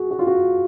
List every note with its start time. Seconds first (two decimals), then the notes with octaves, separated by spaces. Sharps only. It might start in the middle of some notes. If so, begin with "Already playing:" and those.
Already playing: F#4 G#4
0.11 F#4
0.19 F4
0.27 F#4